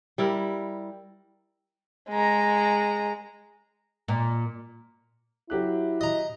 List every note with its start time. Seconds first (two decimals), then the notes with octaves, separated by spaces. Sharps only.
0.18 G3 E4 A#4
2.10 G#3 A#5
4.08 A#2
5.50 F#3 E4 G4 F#6
6.01 D#5 A#5